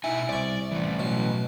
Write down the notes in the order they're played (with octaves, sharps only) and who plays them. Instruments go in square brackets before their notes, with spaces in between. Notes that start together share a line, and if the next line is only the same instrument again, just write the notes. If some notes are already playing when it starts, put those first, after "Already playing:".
[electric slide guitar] B2 D#4 G#5 [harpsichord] E4
[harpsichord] C2 C#6 [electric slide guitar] D5
[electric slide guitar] A2 E3
[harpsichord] B2 F#3